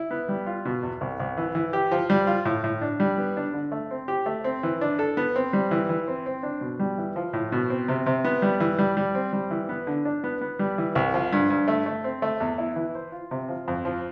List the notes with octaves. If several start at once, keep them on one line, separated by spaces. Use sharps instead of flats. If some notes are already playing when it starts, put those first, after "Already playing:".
Already playing: E4
B3
G3
F4
B2
E2
C2
C2
E3
E3
G4
F3
G3
F4
A2
A2
D4
G3
B3
D4
D3
A3
C4
G4
A3
C4
E3
D4
A4
B3
C4
G3
E3
E3
C4
C4
D4
B2
G3
E3
F3
A2
B2
C4
C3
C3
B3
G3
E3
G3
G3
C4
G3
E3
B3
D3
D4
B3
B3
G3
E3
C2
F3
G2
G2
A3
A3
C4
A3
E2
E4
E3
C5
F4
C3
F3
F2
F3